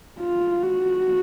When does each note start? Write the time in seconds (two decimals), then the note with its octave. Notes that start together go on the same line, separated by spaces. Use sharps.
0.19 F4
0.62 F#4